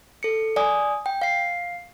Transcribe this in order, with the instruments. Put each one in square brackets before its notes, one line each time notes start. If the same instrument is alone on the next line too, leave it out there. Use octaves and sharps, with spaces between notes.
[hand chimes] A4 C#7
D5 G#5 D#6
G5
F5 C7